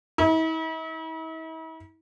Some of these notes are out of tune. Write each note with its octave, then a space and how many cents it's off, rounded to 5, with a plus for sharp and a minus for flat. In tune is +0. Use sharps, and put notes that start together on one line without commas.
E4 -45